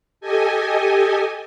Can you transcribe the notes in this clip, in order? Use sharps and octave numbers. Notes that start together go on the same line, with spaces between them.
G4 A4 D#5 G#5